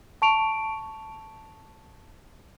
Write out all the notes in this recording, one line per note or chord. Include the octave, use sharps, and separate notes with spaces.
A5 C#6 D7 F7